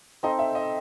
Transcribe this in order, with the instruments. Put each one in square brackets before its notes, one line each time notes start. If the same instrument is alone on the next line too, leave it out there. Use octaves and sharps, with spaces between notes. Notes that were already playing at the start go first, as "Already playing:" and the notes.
[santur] C4 D#4 A4 C5 [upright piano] D#5
[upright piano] E5
D#5